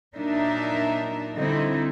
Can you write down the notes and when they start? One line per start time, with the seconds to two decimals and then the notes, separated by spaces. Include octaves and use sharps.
0.16 A#2 F#3 D4 D#4 A#4 E5
1.36 D3 G3 C4 D#4 E4